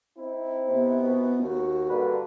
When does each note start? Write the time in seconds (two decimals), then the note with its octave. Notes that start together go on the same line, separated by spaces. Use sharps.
0.18 C4 D#4 E4
0.68 C3 B3
1.03 B2
1.42 D#2 F#4
1.90 G2 D3 A#3 B4